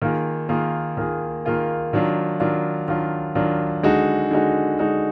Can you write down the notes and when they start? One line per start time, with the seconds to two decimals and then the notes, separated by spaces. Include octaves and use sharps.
0.02 D#3 A#3 F4 G#4
0.49 D#3 A#3 F4 G#4
0.97 D#3 A#3 F4 G#4
1.45 D#3 A#3 F4 G#4
1.93 D#3 F#3 D4 F4
2.40 D#3 F#3 D4 F4
2.88 D#3 F#3 D4 F4
3.35 D#3 F#3 D4 F4
3.83 D3 G#3 D#4 F#4
4.31 D3 G#3 D#4 F#4
4.79 D3 G#3 D#4 F#4